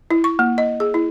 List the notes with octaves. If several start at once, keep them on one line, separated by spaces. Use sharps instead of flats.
E4
C#6
A#3
D#5
G#4
E4